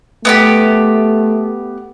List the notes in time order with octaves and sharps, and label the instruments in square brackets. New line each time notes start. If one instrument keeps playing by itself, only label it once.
[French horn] A3 [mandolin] B3 E4 G4